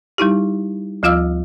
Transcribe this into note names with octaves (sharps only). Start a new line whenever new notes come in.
G3 D#4 E4 G4
D2 F3 F4 F5 E6 F6